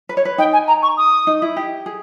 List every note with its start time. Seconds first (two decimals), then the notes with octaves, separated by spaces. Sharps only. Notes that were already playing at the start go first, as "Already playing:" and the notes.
0.09 B4
0.17 C#5
0.25 B4
0.38 D#4 G5
0.53 G#5
0.68 A#5
0.82 C#6
0.97 D#6
1.27 D#4
1.42 E4
1.57 G4
1.86 G#4